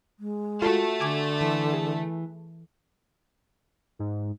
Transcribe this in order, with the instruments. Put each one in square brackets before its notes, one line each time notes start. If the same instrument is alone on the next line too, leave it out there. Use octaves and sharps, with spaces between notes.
[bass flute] G#3
[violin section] A3 [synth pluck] F4 [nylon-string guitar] F#4 A4
[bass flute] D3 [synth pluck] G#5 D6 G#6
[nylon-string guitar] E3
[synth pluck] G#4
[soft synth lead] G#2